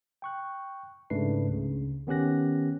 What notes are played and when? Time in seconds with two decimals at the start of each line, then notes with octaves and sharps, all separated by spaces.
0.22 G5 C#6 F#6
1.10 G#2 C#3 A3 D4 B4 C7
1.49 C#2 C#3
2.07 D#3 B3 C#4 G4 F#6 A#6